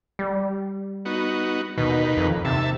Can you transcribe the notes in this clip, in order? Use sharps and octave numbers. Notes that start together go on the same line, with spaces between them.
G3
B3 D#4 F#4
D#2 B2 D#3 B4
F2
D#2 C3 E5 A5